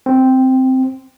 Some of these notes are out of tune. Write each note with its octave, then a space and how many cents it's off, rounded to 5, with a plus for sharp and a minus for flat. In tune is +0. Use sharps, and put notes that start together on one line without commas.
C4 -5